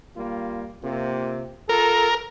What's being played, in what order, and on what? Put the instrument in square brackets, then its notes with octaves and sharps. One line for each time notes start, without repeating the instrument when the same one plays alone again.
[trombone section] G3 A#3 F4
C3 A#3 F4
[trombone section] F4 A4 [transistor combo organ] A#4